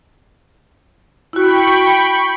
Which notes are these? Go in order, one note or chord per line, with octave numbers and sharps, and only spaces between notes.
E4 F#4 G5 B5 C#6